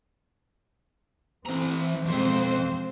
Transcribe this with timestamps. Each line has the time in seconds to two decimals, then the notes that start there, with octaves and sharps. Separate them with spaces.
1.46 E3 C4 A#5
2.06 F2 B2 G#3 C4 C5